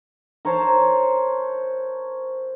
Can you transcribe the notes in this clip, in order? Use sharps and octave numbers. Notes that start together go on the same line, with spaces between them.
A#4 C5 C#5 A5